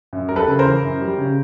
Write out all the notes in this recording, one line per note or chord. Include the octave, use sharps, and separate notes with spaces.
F#2
G3 A#4
A4 B4
C#3
A#4 C5
E3
F#2
G3
C#3